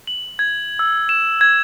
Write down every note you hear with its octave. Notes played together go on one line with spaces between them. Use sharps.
F#7
G#6
E6
E7
G#6